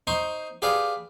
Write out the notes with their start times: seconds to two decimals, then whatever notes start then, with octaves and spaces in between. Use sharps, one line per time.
0.07 D#4 C5 C6 C#6
0.62 G4 G#4 B4 D5 F5